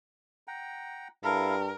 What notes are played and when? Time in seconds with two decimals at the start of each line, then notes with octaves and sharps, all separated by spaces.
0.48 F#5 G5 A#5
1.24 G2 E4 A4 A#4 F5